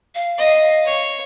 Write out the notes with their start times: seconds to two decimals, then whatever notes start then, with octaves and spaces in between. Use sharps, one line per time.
0.15 F5
0.39 D#5
0.86 C#5